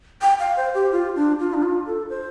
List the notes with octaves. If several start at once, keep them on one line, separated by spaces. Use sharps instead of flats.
G5
F5
C5
G4
F4
D4
F4
D4
F4
A4
C5